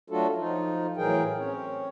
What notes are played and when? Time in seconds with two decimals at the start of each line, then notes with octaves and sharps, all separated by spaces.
0.10 F#3 A3 D4 F4 F#4 A4
0.38 F3 D#4 F4
0.97 A2 E3 F#3 G#4 A#4 G5
1.38 C4 C#4 C#5